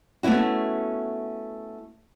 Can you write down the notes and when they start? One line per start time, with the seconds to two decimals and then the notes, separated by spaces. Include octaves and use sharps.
0.23 A3 B3 C#4 E4 F#4